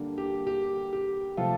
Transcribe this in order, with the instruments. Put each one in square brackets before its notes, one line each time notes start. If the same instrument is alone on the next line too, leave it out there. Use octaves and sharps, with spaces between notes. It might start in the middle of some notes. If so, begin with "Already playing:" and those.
Already playing: [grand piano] D3 G3 A#3 D4
G4
G4
G4
C3 F3 A3 F4 A4